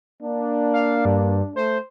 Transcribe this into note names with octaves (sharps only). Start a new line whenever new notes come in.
A#3 D4
F5
G2
A3 C5